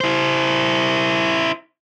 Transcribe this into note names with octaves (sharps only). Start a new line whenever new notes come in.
E4 C5